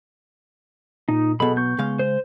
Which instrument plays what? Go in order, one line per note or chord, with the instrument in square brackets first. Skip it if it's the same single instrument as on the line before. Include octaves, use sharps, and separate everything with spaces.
[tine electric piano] A#2 [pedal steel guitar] D#4
[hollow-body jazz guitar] B1 B2 [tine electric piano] G#4 A4 D#5 [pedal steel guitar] B5
[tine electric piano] B3 C#6 [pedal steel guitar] G6
[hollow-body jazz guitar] C#3 G#3 F5
[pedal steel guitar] C5